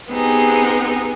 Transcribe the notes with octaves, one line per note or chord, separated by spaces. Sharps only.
B3 C4 D#4 G4 G#4